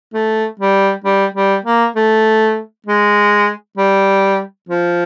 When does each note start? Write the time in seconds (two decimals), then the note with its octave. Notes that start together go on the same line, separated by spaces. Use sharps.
0.14 A3
0.60 G3
1.04 G3
1.35 G3
1.65 A#3
1.96 A3
2.87 G#3
3.78 G3
4.69 F3